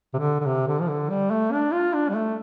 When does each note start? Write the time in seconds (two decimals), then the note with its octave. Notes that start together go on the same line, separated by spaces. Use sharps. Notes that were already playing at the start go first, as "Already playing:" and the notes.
0.14 C3
0.18 D3
0.41 D3
0.46 C3
0.68 D3
0.81 F3
0.88 D3
1.10 G3
1.31 A3
1.52 D4
1.72 F4
1.94 D4
2.09 G3
2.15 A3